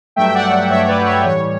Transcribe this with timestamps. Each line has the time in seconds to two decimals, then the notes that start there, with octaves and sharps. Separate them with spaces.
0.16 G2 F#3 A3 E5 G5
0.29 G5
0.34 D5 F#5
0.52 D5 F#5
0.70 G2 F#3 A3 C#5 E5
0.88 B4 D5
1.06 C#5
1.25 A2 E3 G3 C#5